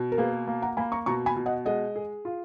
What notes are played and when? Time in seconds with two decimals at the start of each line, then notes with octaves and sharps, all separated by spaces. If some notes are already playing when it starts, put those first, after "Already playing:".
Already playing: B2
0.12 A#4
0.18 A#3 G#4 B4
0.47 A#3
0.62 F#5 A#5
0.77 A#3 G#5 B5
0.92 A#5 C#6
1.06 B2 A#5 C#6
1.26 G#5 B5
1.36 B2
1.46 D#5 F#5
1.65 G#3 D#5 F#5
1.96 G#4
2.25 F4